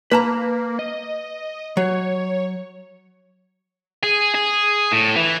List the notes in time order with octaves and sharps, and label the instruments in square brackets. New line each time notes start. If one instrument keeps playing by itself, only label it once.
[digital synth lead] A#3 [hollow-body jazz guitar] B4 A5 A#5
[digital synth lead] D#5
[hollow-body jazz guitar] F#3 [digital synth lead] C#5
[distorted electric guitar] G#4
G#4
A2
E3